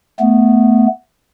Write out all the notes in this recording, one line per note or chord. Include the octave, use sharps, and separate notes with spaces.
A3 B3